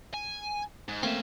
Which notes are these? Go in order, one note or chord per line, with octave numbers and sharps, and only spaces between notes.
G#5
G#2
A3 A#3 C4 C#4 E5